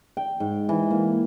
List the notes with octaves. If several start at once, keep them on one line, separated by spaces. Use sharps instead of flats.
G5
G#2
E3
A#3